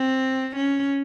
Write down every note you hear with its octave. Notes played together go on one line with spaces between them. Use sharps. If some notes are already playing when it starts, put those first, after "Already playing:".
Already playing: C4
C#4